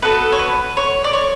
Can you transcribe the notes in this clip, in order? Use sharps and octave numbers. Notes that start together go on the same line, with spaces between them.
B3 F#4 A4 B4
C#5
B4
C#5
D5
C#5